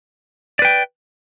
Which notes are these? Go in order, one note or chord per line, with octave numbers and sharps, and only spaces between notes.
B4 D5 G5